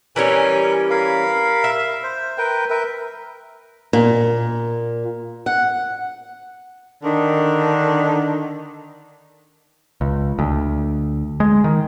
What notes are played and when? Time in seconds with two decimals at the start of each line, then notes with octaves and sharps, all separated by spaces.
0.16 E3 G3 C#4 A#4 G#5
0.90 A#4 F5 B5
1.64 E5
2.04 C5
2.38 A#4 B4 G5
2.70 A#4 B4 E5
3.93 A#2
5.46 F#5
7.03 D3 D#3 D4 A#4
10.01 C#2
10.39 D2
11.40 G#3
11.64 D#3